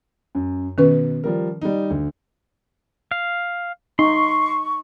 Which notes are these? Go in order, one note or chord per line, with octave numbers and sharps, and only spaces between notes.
F#2
B2 D#3 C#4 B4
F3 G3 A#4
G3 D#4
D2
F5
D#4 C6 C#6